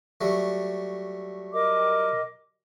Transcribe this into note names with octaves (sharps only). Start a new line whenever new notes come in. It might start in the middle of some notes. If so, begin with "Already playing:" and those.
F#3 G3 A3
A#4 D#5 D6